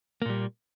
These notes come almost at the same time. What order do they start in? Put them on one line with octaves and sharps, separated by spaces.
A#3 A#2 G3